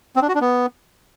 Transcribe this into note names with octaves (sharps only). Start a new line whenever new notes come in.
C4
D4
F#4
D4
B3